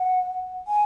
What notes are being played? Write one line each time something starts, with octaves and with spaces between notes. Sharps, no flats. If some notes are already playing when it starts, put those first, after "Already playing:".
Already playing: F#5
G#5